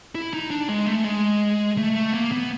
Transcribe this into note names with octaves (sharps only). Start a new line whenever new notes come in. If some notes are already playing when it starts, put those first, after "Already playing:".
E4
D#4
D4
G#3
A3
G#3
A3
A3
A#3
B3